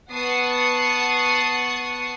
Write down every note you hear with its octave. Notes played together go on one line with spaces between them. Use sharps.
B3 F#5 A5 C#6 D#6 C7